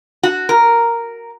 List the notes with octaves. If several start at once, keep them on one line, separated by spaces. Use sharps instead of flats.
F#4
A#4